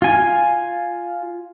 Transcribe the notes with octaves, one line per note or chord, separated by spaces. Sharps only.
F4 G#5